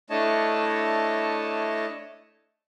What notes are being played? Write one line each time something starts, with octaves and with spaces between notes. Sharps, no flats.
A3 D4 E4 C#5 D#5 A5